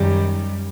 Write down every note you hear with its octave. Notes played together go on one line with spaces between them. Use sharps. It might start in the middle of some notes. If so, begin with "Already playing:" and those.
Already playing: F#2 D#3 G3